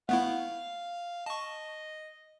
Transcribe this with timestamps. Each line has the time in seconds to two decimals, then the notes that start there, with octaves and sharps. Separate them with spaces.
0.09 A3 B3 E4 F5 F#5
1.26 D#5 A5 C#6